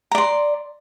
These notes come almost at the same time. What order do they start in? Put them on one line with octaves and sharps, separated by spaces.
A#5 D5 C6